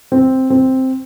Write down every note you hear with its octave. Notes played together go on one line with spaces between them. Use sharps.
C4
C4